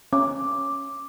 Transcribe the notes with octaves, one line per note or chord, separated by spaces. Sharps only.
C#4 D6